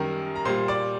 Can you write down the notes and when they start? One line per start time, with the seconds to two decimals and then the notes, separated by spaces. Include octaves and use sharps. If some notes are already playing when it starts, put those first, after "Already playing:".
Already playing: F#2 D#3 G3 A#4 A#5
0.36 A#5
0.45 A#2 G3 C5 C6
0.68 D5 D6